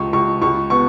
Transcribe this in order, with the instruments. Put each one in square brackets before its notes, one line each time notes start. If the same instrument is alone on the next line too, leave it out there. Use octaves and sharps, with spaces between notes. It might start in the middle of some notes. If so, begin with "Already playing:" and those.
Already playing: [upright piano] C#2 [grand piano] C#6
[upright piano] C#2 [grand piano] C#6
[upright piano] C#2 [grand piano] C#6
[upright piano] B3 [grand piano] C#6